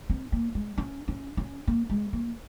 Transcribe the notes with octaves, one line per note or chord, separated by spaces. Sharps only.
C4
A#3
G#3
C#4
C#4
C#4
A#3
G#3
A#3